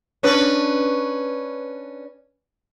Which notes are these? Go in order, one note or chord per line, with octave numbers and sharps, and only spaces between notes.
C#4 D4 B4